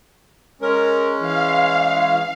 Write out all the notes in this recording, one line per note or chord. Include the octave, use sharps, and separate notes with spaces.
G#3 C#4 A#4
E3 F5